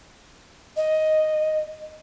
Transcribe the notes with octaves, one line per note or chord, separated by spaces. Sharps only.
D#5